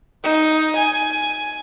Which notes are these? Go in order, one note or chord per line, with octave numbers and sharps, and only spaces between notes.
D#4
G#5